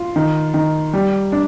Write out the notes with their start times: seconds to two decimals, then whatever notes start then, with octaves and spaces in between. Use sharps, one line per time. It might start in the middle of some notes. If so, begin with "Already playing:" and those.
Already playing: F4
0.16 D#3
0.54 D#3
0.93 G3
1.32 D4